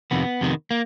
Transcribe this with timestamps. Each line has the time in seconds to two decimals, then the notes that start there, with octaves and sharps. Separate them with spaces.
0.11 F2 C3 D#3 B3
0.41 F2 C3 D#3
0.71 A#3